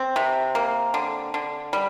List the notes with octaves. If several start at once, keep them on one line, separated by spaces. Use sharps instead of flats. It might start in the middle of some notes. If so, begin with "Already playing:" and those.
Already playing: C4
C3
A#3
D3
D3
G3